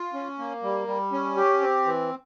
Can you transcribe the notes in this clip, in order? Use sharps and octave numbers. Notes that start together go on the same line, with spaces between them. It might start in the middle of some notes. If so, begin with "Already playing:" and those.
Already playing: F4
C#4
A#3
G3
G3
C#4
G4
C4
E3